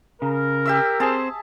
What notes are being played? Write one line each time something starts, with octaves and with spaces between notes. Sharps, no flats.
C#3 A#4
G4 E5 E6
C4 G#4 C5 A5